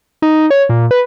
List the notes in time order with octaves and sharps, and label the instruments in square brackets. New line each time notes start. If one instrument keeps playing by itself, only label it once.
[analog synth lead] D#4
C#5
A#2
B4